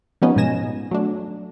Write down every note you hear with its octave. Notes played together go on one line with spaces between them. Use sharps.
F3 G3 B3 C#4 D#4
G#2 B2 F3 G#5 A#6 E7
F#3 A3 D4